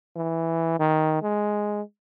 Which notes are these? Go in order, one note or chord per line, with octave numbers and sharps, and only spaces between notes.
E3
D#3
G#3